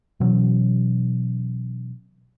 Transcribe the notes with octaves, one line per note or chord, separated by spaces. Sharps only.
B2 E3 F#3 C#4